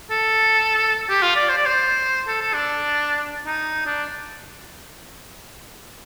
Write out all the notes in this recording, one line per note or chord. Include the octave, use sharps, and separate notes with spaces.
A4
G4
F4
D5
C5
D5
C5
A4
A4
D4
D#4
D4